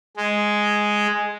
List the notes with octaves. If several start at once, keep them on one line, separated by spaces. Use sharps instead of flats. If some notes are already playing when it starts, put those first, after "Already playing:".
G#3